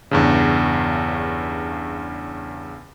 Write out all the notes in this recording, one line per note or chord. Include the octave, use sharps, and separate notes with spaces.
E2 G2 C#3